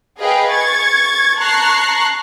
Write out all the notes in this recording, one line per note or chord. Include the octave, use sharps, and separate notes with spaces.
G#4 B4 D#5 F5 G5
C#6 G#6 A6
A5 A#5 C#6 F#6 C7